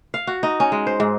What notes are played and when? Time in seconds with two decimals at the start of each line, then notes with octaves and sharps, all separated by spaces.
0.14 F5
0.27 F#4
0.43 D#4
0.60 C#4
0.72 G#3
0.87 C5
1.00 G#2